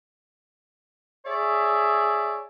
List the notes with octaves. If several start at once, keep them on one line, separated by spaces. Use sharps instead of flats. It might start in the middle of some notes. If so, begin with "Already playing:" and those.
G#4 C#5 D5 E5